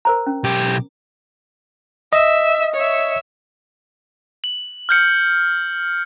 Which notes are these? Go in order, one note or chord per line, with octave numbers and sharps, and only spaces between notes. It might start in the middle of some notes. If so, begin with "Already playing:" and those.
A#4 C5 A#5
C#4
B1 G4
D#5 E5
C#5 E5
F#7
F6 G6 C#7